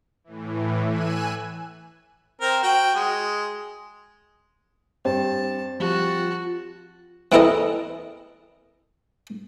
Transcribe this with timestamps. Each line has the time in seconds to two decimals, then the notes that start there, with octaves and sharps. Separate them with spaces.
0.24 A2 E3
0.89 G#5 E6 F#6 D#7
2.41 C4 A#4
2.63 F#4 G5
2.95 G#3
5.05 G2 C4 A5
5.80 F3 G3 F4 F#4 A5
7.32 E3 C4 E4 A4 A#4 D#5